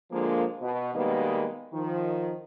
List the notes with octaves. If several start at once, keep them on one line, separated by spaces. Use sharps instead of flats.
D3 F3 G#3 A#3
B2
B2 D#3 G3 G#3 A#3 B3
D#3 F3